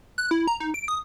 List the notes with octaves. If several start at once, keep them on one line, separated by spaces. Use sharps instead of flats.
F#6
E4
A#5
D#4
D7
D#6